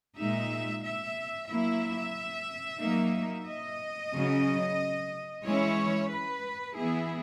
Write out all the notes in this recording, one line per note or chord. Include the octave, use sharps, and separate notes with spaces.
A#2 G#3 D#4 E5
E5
F#3 A#3 E4 E5
F#3 A#3 D#4
D#5
C#3 F#3 C#4
E3 G#3 C#4 E4 C#5
B4
E3 B3 E4 G#4